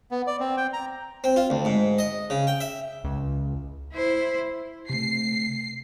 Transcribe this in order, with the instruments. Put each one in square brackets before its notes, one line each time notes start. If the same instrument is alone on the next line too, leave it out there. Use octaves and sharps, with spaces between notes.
[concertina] B3
D5
C4
G5
A#5
[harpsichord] C4
F4
D2
G#2
D#5
C#3
G5
E5
[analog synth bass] C#2
[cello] E4 C5
[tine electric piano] C3 A3 [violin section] C7